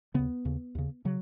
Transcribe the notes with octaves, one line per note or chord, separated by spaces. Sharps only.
D#2 C#3 B3
D#2 C#3
D#2 C#3
C#3 F#3